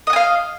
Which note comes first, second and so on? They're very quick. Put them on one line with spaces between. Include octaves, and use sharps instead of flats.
D#5 F#5 G#5 F5